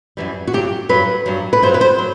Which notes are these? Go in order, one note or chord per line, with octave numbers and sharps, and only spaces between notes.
F#2 E3 G3
F#4
G2 F#3 G4
G2 F#3 B4
G2 F#3
B4
G2 F#3 C5
B4
C5
F#3